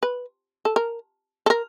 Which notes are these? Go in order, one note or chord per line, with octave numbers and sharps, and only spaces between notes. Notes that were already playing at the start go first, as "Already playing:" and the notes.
B4
A4
A#4
A4
A#4